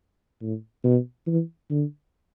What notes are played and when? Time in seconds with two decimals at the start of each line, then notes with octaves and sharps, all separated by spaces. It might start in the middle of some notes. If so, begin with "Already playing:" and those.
0.42 A2
0.84 B2
1.27 E3
1.70 D3